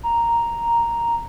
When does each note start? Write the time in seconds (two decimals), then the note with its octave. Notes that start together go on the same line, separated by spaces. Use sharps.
0.03 A#5